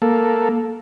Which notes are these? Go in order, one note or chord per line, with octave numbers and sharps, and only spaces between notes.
A#3 A4